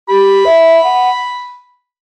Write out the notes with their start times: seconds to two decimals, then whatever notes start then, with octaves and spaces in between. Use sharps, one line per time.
0.09 G4 B5
0.45 E5
0.84 F#5